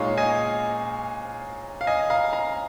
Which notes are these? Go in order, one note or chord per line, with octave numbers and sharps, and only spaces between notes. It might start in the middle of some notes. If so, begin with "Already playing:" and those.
Already playing: A#2 G#3 D#4 C#5 F5
D#5 G#5
F5
D#5 G#5
F5 A#5
F5 A#5